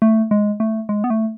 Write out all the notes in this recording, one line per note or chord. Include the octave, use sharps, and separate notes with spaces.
A3
G#3
A3
G#3
B3
A3